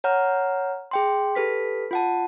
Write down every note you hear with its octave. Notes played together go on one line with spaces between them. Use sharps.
C#5 F#5 A#5 F6
G#4 G5 C6
G4 A4 B4 B6
F4 F#5 A5